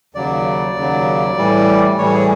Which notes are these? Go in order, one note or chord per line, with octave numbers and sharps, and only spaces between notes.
D#2 C#3 F#3 D5
D#2 C#3 F#3
A2 E3 G3
A2 E3 G3 C#5
G#4